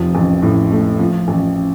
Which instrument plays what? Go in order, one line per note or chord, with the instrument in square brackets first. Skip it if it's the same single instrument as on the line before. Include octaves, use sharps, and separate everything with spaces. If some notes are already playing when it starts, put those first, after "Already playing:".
Already playing: [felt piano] F1 F3
A1
A2
A3
F3
A1